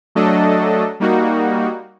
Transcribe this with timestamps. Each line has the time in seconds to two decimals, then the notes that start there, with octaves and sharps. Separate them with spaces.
0.15 F#3 A3 D4 A4 D#5
1.00 G3 A#3 D#4 F#4